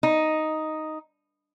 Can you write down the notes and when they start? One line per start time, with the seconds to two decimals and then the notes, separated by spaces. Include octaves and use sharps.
0.03 D#4